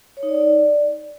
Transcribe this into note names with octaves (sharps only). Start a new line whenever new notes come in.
C#5
D#4
D5
D#4
D5